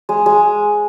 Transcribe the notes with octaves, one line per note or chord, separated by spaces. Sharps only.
G#3
G#3